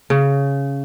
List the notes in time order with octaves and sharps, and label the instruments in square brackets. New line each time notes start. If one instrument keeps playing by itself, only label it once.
[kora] C#3